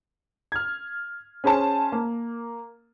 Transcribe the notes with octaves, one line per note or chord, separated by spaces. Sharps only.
F6 G#6
C#4 G#4 C5 G#5 A5
A#3